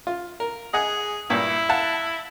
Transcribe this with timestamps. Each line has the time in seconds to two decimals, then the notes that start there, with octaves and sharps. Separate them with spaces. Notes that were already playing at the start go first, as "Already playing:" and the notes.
0.07 F4
0.40 A#4
0.74 G#4 D#5 F#5 G#5
1.30 G2 A#2 E4 E5
1.69 F5 F#5 A5